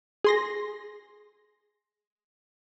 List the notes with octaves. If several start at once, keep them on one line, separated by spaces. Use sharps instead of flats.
G#4 C6 A#6